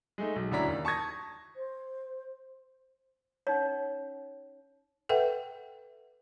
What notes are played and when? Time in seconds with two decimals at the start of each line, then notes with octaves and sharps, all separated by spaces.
0.18 G#3 A3 D#4
0.36 B1
0.52 D2 C#4 D4 E4 A#5 B6
0.68 D#2
0.85 A5 C#6 D#6 G#6 A#6
1.56 C5
3.47 C#4 D#4 C#5
5.09 A4 B4 E5 F#5 G5